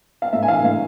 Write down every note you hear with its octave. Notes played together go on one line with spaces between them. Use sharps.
F5
A2 E5
G#5
E3 F5
A2 F5